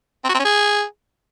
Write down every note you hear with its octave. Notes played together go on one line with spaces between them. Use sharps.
C4
F#4
C4
C#4
G#4